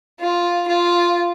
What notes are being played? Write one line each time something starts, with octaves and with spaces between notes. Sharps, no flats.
F4
F4